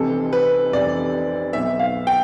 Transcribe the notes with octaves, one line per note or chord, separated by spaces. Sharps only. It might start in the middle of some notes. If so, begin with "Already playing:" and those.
Already playing: F1 F2 C3 E3 A4
B4
F1 F2 C3 E3 D5
B1 B2 E5
F5
G5